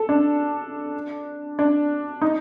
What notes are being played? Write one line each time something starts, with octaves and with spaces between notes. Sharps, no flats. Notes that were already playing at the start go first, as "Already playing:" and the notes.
Already playing: A4
D4
D4
D#4